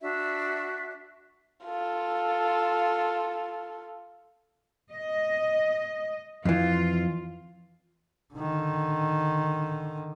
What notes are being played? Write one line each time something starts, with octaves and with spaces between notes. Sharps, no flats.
D4 F#4 E5
F4 A4
D#5
F2 E3 F4
D3 D#3